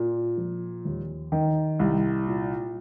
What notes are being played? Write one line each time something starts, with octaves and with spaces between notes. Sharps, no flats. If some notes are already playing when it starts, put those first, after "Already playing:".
Already playing: A#2
F3
D#2
D#3
C2
A#2